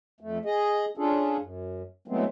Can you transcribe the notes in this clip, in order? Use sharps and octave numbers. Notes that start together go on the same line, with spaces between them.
F2 A3
G#4 D#5
C#4 D4 F4 G#4 A4
F#2
E3 F#3 G#3 A3 B3 C4